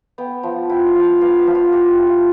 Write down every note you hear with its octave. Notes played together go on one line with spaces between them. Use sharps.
B3 G5
F3
E4 G5
F5
F3
F5
B3 F5
E5
F3
F4
E4 G4
F3
F4